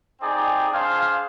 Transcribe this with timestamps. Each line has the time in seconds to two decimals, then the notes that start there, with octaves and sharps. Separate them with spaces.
0.21 C4 D#4 G#4 D5 G5
0.70 D4 G#4 C5 F5